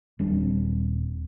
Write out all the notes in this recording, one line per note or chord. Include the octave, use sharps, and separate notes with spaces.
D#1 G3 C4 D4